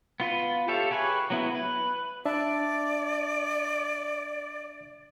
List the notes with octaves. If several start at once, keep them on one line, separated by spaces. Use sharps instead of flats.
B3 F4 B4
G4 A4 C#5 E5 F5
G4 G#4 B4 C#5 G#5
F#3 B3 E4
B4
D4 D5 E5 A5